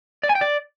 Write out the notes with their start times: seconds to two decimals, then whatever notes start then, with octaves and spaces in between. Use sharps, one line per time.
0.23 D5
0.29 G#5
0.35 G5
0.41 D5